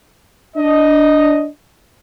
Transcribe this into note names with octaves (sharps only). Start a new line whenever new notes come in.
D4 D#5